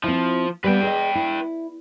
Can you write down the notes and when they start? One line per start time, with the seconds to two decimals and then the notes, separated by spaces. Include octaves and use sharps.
0.04 F3 C4 E4
0.64 G3 B3 B4 G5
0.83 G#4 D#5
1.15 E4